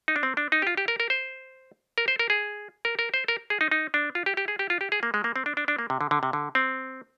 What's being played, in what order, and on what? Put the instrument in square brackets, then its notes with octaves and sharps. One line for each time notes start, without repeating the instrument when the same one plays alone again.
[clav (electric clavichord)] D#4
D4
C4
D4
D#4
G4
F4
G4
A#4
A#4
C5
A#4
C5
A#4
G#4
A#4
A#4
C5
A#4
G#4
D#4
D#4
D4
F4
G4
G4
G#4
G4
F4
G4
G#4
A#3
G#3
A#3
C4
D4
D4
D4
A#3
C3
D3
D3
C3
D3
C4